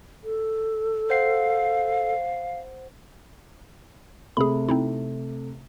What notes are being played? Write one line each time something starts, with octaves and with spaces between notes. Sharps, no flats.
A4
C5 F5 F#5 C7
C3 A3 G#4 B5
C4 D#4 E4